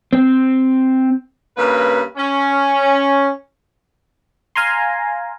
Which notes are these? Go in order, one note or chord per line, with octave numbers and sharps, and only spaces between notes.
C4
G2 C#3 A#3 B4
C#4
F5 G#5 A#5 C6